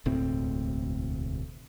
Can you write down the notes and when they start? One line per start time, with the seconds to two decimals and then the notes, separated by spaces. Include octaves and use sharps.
0.05 E1 D2 A2 C4